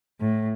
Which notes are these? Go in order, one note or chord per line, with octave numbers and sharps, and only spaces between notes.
A2